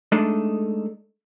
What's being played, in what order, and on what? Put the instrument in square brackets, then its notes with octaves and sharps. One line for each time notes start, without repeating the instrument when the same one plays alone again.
[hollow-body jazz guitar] G#3 A3 D4 D#4 A4 D5